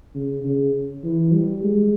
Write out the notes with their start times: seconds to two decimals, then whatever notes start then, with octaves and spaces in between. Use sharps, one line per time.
0.15 C#3
0.44 C#3
1.04 E3
1.33 G3
1.63 G#3